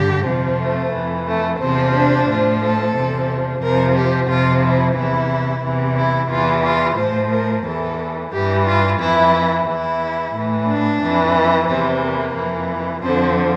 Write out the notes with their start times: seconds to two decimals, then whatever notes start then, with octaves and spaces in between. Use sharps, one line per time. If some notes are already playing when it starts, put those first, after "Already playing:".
Already playing: G2 D3 G4
0.26 F2 C3 F3
0.59 A3
0.93 F2 E3
1.26 A3
1.60 E2 C3 F3 C4
1.94 D4
2.27 A2 F3
2.61 A4
2.94 E2 C3 F3
3.62 F2 C3 F3 A#4
3.95 G4
4.29 F2 C3 F3 F4
4.62 E4
4.96 E2 C3 E3 E4
5.63 E2 C3 E3
5.97 E4
6.30 E2 E3 F4
6.64 F4
6.98 A2 F3 C5
7.31 A#4
7.65 E2 E3 A4
8.32 G2 E3 G4
8.66 F4
8.99 F2 E3 E4
9.66 E2 E3 E4
10.34 A2 E3
10.68 D4
11.01 F2 E3
11.68 E2 C3 E3 C4
12.01 A#3
12.35 F2 E3
13.02 F2 D3 F3 C4